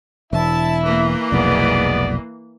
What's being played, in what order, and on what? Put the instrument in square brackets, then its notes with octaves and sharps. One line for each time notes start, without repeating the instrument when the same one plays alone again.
[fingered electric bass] E1 [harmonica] E4 E5 [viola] A5
[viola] E3 A#3
[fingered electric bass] F1 B1 [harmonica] G#3 B3 D5